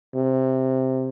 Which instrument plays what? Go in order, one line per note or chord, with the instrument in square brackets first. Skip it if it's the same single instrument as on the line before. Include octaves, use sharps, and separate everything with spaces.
[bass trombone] C3